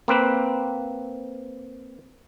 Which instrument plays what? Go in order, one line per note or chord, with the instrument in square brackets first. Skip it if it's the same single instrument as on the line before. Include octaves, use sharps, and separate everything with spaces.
[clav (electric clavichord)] A#3 C4 B4